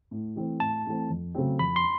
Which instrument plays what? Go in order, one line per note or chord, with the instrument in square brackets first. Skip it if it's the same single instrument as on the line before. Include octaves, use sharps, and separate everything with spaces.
[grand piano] A2
E3 A3 C4
[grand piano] A2 [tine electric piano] A5
[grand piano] E3 A3 C4
F2
C#3 F#3 A3 C4
[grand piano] F2 [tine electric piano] B5
[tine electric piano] C6